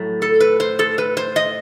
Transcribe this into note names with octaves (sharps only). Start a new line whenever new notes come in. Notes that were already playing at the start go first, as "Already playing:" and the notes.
Already playing: A2 F#3 A3
A4
B4
C5
A4
B4
C5
D#5